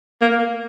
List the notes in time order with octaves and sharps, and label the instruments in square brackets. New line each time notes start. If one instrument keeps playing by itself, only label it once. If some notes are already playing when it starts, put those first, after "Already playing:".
[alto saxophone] A#3